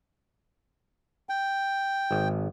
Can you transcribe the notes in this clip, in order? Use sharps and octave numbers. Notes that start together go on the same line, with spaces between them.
G5
G#1